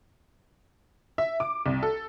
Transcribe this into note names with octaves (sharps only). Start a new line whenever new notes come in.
E5
D6
C2
A4